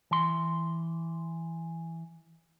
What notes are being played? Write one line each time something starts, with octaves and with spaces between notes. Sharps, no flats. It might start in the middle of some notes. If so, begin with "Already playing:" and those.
E3 C6